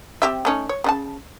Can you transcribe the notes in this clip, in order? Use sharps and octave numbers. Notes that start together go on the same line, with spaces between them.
C4 G4 E5
A3 C#4 D#4
C#5
C#3 D#4 A5